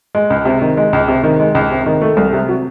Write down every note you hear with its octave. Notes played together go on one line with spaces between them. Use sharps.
G#3
C#2
C3
D#3
G#3
C#2
C3
D#3
G#3
C#2
C3
D#3
A3
C2
C3
F#3